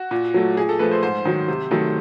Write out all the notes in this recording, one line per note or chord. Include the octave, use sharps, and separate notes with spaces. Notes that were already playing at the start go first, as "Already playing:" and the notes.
Already playing: F#4
A#2
F#3 A3
A#2 G#4
A4
F3 A3 B4
C5
G#2 C5
D#3 F#3
C3
D#3 F#3 A3